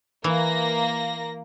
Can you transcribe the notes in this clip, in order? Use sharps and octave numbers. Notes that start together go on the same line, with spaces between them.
E3 A#3 A#6